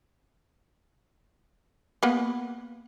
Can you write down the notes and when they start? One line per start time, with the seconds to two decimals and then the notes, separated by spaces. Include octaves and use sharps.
2.03 A#3 B3